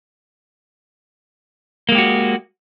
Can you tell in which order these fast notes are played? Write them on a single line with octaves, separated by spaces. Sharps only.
A#3 G#3 G4 F#4